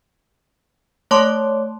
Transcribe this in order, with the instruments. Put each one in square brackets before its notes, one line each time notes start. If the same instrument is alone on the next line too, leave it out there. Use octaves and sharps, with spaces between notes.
[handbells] A3 C#5 A5 C6 D6